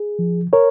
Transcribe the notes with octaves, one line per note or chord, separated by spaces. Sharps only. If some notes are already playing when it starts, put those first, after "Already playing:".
Already playing: G#4
F3
A#4 C#5